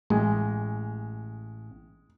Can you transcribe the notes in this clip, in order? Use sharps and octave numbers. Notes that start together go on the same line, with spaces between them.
A1 G#3